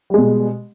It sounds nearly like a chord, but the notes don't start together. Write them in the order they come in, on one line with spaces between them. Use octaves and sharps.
G3 G#3 B2